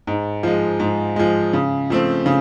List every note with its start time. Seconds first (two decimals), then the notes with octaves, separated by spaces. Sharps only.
0.07 G#2
0.43 F3 G#3
0.80 G#2
1.16 F3 G#3
1.53 C#3
1.90 F3 A3 C4
2.26 C#3